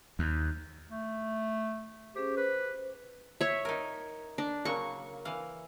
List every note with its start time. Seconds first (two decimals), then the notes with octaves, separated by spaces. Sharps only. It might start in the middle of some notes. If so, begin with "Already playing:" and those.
0.19 D#2
0.90 A3
2.15 C#4 G4 G#4 C5
2.37 B4 C5
3.41 C#5 E5
3.65 D#4 A#4
4.38 D4
4.65 C#3 F#3 A#3 C#6
5.25 E3 F5